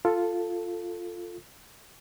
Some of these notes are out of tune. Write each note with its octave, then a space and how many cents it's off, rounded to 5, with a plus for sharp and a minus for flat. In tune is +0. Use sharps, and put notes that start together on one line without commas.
F4 +0 A4 +5